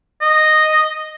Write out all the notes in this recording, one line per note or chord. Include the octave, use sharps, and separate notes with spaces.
D#5